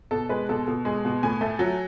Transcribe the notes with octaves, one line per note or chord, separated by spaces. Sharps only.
B2 A4
G#3 B4
B2 A4
B2 A4
G#3
B2
A2 G#5
A3
F#3